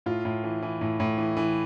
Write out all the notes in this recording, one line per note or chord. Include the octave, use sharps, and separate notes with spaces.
A2 F4
A2
E3
E3
A2
A2
E3
E3